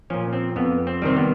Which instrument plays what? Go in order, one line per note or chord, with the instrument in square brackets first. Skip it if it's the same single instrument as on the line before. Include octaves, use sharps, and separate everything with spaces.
[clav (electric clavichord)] A#2 F3 C#4
C4
F2 B3
C4
C3 D#3 G3 C4
B3